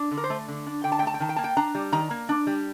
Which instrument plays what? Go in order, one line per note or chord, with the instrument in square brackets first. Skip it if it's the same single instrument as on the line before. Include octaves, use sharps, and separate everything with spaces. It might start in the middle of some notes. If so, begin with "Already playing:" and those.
Already playing: [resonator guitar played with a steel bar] D4
D3
A#4
C5
A3
D3
D4
D3 G5
A5
G5
A3 A5
G5
D#3 A5
G5
A#3 A5
G5
D4 A#5
G3
D#3 A#5
A#3
D4
G3